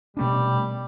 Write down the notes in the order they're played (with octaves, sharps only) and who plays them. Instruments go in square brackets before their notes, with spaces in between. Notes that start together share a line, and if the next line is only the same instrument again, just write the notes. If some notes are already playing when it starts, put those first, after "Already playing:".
[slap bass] B2 A3 D4 [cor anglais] G3